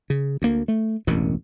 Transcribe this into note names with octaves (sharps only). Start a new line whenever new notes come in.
C#3
D2 A#3
A3
E1 A1 F#2 B2